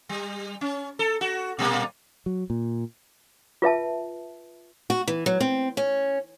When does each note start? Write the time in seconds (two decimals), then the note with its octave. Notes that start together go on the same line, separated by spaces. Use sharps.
0.09 G3
0.61 C#4
0.99 A4
1.21 F#4
1.59 A#2 G3 A#3
2.26 F#3
2.50 A#2
3.62 F4 B4 E5 A5
4.90 F#4
5.07 E3
5.26 F#3
5.40 C4
5.77 C#4